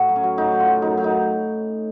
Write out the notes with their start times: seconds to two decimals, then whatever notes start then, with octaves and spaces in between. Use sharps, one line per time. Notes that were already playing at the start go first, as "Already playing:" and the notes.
Already playing: A2 F#4
0.09 F#3
0.16 C#4
0.24 F#3
0.38 A2 D#4
0.52 F#3
0.60 F4
0.67 F#3
0.82 F#2 D#4
0.97 F#3
1.04 D#4